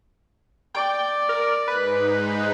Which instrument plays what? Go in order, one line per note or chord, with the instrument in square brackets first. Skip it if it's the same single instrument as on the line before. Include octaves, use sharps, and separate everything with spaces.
[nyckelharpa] D5 [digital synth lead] G5
[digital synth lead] A#4
[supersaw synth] G#2 G#3 D#4 [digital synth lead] B4